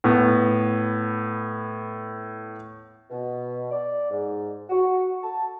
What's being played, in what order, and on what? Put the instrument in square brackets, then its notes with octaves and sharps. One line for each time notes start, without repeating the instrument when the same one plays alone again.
[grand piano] A2 B3
[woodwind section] B2
D5
G#2
F#4
A5